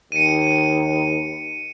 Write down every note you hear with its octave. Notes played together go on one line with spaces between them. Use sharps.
D#2 C#7 D#7